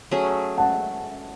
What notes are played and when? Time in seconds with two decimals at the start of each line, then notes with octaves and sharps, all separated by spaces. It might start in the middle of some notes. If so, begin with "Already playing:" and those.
0.11 F#3 A3 C#4 G#4
0.58 F#5 A5